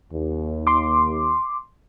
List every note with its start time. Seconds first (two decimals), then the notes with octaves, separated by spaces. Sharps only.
0.12 D#2
0.67 C6 D6